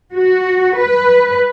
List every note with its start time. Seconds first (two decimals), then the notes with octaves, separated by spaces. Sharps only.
0.14 F#4
0.77 B4